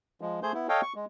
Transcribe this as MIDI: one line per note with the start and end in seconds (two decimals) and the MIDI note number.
0.21 0.40 53
0.21 0.40 56
0.43 0.52 57
0.43 0.52 68
0.43 0.52 72
0.43 0.52 91
0.54 0.67 59
0.54 0.67 64
0.69 0.81 69
0.69 0.81 73
0.69 0.81 75
0.69 0.81 77
0.69 0.81 79
0.82 0.93 85
0.95 1.05 56